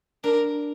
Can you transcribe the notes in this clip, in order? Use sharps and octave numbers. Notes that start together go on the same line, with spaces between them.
D4 A#4